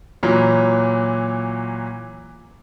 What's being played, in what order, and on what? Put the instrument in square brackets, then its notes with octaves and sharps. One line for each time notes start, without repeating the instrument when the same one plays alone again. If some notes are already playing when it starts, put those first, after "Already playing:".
[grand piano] A#2 E3 F#3